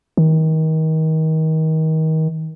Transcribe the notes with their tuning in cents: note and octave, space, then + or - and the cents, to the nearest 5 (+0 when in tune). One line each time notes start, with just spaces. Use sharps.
D#3 +30